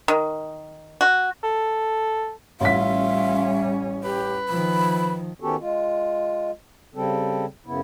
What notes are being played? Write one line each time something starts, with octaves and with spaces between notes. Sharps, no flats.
D#3
F#4
A4
A1 G3 C#4 F4 E5 B6
G4 B4
D#3 F3 B5
D#3 B3 C#4 F#4 G4 A4
G#3 F4
C#3 G3 C4 A4
F#2 C#3 B3 E4